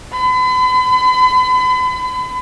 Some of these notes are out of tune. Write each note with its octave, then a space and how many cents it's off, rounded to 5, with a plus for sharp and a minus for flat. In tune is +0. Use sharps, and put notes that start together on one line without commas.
B5 +40